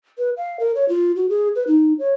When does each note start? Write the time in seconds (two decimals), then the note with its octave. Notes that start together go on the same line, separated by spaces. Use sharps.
0.18 B4
0.37 F5
0.60 A#4
0.75 C#5
0.89 F4
1.16 F#4
1.29 G#4
1.55 B4
1.67 D#4
1.99 C#5